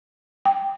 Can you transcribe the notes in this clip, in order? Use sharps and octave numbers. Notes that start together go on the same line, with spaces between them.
G5